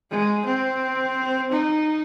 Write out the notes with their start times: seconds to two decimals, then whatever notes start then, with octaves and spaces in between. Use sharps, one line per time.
0.11 G#3
0.46 C4
1.52 D#4